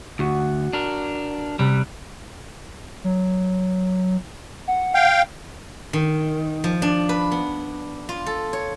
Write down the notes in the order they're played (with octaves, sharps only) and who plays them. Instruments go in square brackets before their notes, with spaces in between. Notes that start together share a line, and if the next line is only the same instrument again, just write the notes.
[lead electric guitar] D2 [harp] F#4
[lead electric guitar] D4 A#4
[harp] C3 B5 F#6 [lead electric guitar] G3
[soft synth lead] F#3
F#5
[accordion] F5 G5
[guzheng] D#3
F3
D4
B4
B3
F4
A4
C#5